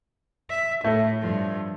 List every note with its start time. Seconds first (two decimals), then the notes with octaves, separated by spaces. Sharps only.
0.50 E5
0.84 A2 A3
1.21 G2 F3